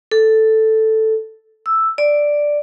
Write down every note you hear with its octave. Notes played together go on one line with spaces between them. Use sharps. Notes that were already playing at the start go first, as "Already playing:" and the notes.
A4
E6
D5